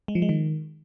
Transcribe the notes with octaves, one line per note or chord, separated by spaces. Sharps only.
G#3
F3
G#3
D#3